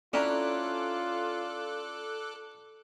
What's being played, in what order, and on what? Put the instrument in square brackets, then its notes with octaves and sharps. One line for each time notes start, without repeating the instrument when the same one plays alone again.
[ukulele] C#4 E4 A#5 [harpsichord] D4 [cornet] F4 [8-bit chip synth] A4 D6 F#6